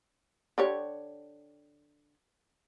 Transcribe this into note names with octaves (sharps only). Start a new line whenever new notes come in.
D3 G4 C#5